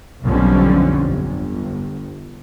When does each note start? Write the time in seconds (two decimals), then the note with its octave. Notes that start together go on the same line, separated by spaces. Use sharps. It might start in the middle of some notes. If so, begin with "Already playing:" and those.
0.24 B1 F2 D3 F3 G3 C#4
1.07 G1